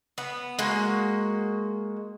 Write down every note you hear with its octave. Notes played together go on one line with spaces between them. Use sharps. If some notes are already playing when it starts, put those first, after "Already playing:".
B3
G#3 A#3 F#4